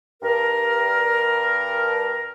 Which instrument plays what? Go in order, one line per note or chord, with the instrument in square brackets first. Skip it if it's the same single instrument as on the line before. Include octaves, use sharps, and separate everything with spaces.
[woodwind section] G2 A#4